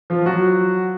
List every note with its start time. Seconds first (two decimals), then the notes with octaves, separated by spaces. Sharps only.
0.10 F3 F4
0.26 F#3 F#4